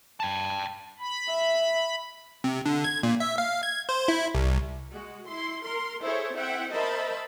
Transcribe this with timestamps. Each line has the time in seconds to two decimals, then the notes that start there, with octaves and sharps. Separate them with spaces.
0.20 G5 A5
0.99 B5
1.29 E5
2.44 C3
2.66 D3
2.84 G#6
3.03 A#2
3.20 E5
3.38 F5
3.63 G#6
3.89 C5
4.08 E4
4.35 C2
4.90 G#3 F#4
5.27 E4 C6
5.63 A#4 C6
6.03 E4 G#4 A4 C5 C#5 E5
6.35 C4 E4 E5 F#5 G5
6.70 A#4 C5 D#5 E5 A5 B5